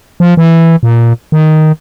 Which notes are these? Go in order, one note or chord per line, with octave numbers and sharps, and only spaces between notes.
F3
E3
A#2
D#3